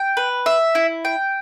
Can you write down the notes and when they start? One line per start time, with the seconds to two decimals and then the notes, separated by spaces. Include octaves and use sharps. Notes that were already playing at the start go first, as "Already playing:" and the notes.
Already playing: G5
0.17 B4
0.46 E5
0.75 E4
1.05 G5